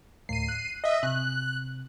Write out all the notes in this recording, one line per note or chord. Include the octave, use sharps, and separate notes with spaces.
D2 A2 C7 D#7
F#6
D#5 E5
C3 F#6